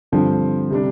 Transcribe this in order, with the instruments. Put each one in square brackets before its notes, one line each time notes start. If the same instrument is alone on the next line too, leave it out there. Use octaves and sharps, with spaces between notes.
[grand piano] G2 F3 C4 [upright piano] D3
[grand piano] C3 G3 D4